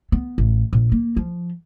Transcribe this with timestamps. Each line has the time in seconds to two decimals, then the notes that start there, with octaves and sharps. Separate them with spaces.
0.12 B3
0.38 A1
0.73 A#1
0.92 A#3
1.17 F3